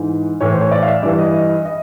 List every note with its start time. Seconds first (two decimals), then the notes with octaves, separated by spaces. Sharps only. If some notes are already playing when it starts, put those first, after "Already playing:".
Already playing: G#2 E3
0.40 A2 E3 C#5
0.51 C5
0.61 C#5
0.71 D5
0.82 F5
0.87 E5
1.02 G2 E3 D5
1.18 D#5
1.65 D#5